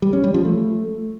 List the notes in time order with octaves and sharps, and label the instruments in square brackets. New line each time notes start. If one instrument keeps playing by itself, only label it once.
[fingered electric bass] G3
C#4
G3
F3
A3